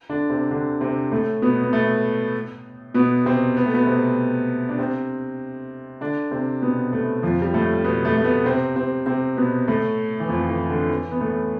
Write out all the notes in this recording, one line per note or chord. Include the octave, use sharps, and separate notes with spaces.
D3 D4
C3 C4
D3 D4
C3 C4
A2 A3
B2 B3
B3
A2 A3
B2 B3
C3 C4
B3
A3
B2 B3
C3 C4
D4
C3 C4
D3 D4
C3 C4
B2 B3
A2 A3
F2 F3
G3
A2 A3
B2 B3
A2 A3
A3
B2 B3
C3 C4
C3 C4
C3 C4
B2 B3
A2 A3
E3
F2 F3
E3
D3
E3
B3
A2 A3